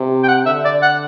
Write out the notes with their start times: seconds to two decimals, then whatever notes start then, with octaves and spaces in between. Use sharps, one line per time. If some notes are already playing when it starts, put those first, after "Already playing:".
Already playing: C3
0.23 G5
0.28 F#5
0.46 D3 E5
0.65 D5
0.82 F#5